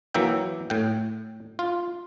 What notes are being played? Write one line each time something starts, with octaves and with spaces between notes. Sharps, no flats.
E3 F#3 A#3 E5 G5
A2 G5
F4